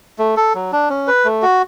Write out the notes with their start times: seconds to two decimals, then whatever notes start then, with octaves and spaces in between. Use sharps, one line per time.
0.18 A3
0.37 A4
0.55 F#3
0.72 D4
0.90 C#4
1.07 B4
1.25 A3
1.42 F#4